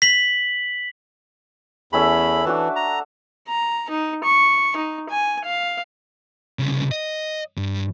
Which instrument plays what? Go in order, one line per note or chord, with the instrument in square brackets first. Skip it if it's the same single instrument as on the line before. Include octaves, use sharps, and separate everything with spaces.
[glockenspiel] B6 F#7
[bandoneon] E2 B5 [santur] A3 C#4 E5
[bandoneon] E3 [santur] D4 F#4 A5
[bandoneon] A#5
[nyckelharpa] A#5
D#4
C#6
D#4
G#5
F5
[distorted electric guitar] C2 C#3
D#5
G2